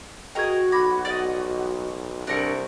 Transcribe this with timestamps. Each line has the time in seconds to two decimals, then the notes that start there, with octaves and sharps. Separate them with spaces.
0.35 F#4 G#4 A#4 D#5 G5 C#6 G#6
0.72 B1 B5 D6 G#6 A#6
1.05 D5 D#5
2.27 C2 D4 A#4 C#6